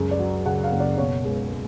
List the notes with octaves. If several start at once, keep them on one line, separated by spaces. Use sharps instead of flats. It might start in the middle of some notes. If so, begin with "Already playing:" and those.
Already playing: C#2 F#2 G#4
D5
F#3
C#3 F#5
F5
F#1
D5
B2 C#5
C#2
G#3